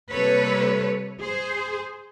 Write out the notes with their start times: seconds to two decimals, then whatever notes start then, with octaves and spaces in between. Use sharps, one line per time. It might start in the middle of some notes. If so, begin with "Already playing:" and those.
0.13 C3 G3 A#3 A4 B4 C#5
1.20 G#4 C5